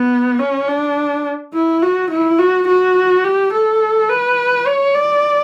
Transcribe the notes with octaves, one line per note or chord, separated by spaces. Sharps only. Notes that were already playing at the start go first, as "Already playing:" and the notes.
Already playing: B3
C#4
D4
E4
F#4
E4
F#4
F#4
G4
A4
B4
C#5
D5